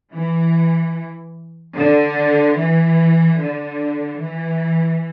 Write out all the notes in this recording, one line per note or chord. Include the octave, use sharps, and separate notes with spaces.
E3
D3
E3
D3
E3